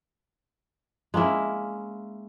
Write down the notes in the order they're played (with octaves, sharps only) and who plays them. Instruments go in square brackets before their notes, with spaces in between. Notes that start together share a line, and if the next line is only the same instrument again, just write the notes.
[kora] G#3 A#3 C#4 E4